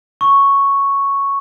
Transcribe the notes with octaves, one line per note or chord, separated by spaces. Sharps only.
C#6